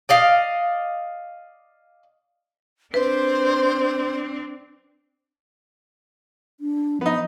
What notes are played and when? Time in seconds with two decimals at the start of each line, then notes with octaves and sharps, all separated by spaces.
0.09 D5 D#5 F5
2.94 C4 D4 B4 C5
6.60 D4
7.01 F3 B3 D#4